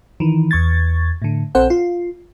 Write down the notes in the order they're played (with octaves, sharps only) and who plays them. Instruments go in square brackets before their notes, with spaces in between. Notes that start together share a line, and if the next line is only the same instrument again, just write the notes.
[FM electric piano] D#3 E3
E2 C#6 G#6 A6
A2 D3
A#1 C4 A4 C5 F#5
F4